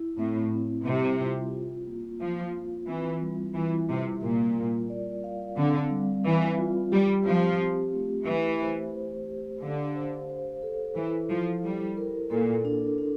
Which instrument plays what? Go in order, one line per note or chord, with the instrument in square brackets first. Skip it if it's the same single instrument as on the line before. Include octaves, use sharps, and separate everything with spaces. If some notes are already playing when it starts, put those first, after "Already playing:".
Already playing: [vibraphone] E4
[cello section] A2 [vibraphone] C4
[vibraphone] C4
[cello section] C3 [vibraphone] G3
[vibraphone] F4
F4
A#3
[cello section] F3 [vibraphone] F4
[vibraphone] F4
[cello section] E3 [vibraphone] C4
[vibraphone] G3
[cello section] E3 [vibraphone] E4
[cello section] C3 [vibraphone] G3
[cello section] A#2 [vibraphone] A#4
[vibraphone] F4
D5
F5
[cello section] D3 [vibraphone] C4
[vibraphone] G3
[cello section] E3 [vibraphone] G3
[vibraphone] F4
[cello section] G3 [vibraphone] G4
[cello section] F3 [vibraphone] C4
[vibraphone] C4
A3
[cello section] E3 [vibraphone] G4
[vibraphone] C5
C5
G4
[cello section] D3 [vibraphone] F5
[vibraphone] C5
C5
A4
[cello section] E3 [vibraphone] E4
[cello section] F3 [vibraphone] E4
[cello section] G3 [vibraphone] E4
[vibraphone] A#4
[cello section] A#2 [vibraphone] A4
[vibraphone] D4
D4